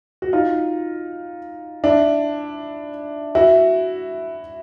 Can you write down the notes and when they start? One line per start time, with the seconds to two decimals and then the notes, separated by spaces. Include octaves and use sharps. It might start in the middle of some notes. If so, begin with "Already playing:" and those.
0.22 F#4
0.33 D#4 F4
1.84 D4 E4
3.35 E4 F#4